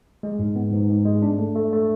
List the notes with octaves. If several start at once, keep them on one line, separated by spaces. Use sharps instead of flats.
G#3
G#2
B3
G#2
G#2
G#3
D4
A3
A3
A3